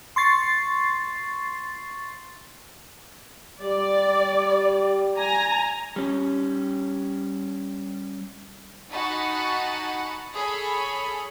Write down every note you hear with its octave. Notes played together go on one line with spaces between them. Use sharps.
C6 C#6 A6 C7
G3 D5
G#5 A#5
G3 C#4
D#4 F#4 F#5 G#5 A5 B5
G#4 A4 C#5 B5